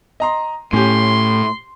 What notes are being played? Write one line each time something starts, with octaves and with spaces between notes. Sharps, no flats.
D#5 A#5 C6
A2 C#4 G4 C6